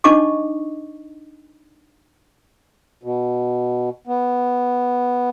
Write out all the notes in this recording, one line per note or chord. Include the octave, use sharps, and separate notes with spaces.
D4 D#4 D#5 A5 C#6 D6
B2
B3